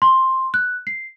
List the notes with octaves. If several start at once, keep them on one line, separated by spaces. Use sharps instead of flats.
C6
F#6
C7